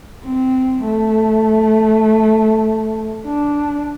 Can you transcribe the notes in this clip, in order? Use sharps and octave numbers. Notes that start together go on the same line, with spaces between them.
C4
A3
D4